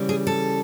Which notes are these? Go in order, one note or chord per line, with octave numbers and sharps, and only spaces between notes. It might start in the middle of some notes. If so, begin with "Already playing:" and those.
Already playing: C#3 E3 G3
G#4
A4